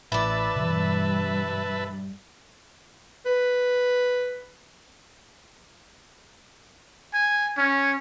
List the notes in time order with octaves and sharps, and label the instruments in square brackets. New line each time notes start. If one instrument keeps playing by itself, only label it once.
[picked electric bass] A1 [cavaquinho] E4 D5 [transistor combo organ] B4 E5 A5
[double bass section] G2 G3 [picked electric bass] B2 E3
[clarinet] B4
[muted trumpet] G#5
C#4